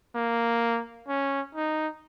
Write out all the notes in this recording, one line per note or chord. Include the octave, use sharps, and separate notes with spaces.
A#3
C#4
D#4